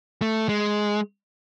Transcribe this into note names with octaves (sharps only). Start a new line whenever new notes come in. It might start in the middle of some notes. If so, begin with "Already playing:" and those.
A3
G#3